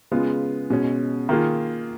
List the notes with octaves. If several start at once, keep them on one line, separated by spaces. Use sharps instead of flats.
C#3 G#3 B3 F4
B2 G#3 C#4
D#3 A#3 F4 G#4